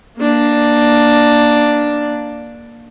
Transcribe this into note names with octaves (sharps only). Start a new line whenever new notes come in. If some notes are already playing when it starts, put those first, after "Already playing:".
A#3 D4